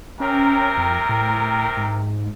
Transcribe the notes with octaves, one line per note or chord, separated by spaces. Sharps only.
C3 C4 C#4 A#4
F2
A2
G#2